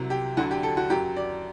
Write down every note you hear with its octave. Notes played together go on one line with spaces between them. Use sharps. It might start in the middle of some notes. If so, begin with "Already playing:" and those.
Already playing: C2 C3 F#3
G4
D2 D3 F#3 F#4
G4
A4
F#4
F#2 F#3 G4
D5